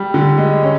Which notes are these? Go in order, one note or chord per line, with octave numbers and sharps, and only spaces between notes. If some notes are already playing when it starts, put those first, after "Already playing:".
Already playing: G3
D3
G#3
C#4